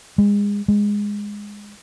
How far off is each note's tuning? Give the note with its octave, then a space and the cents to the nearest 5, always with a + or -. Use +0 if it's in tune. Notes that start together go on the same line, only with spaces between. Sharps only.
G#3 -30
G#3 -10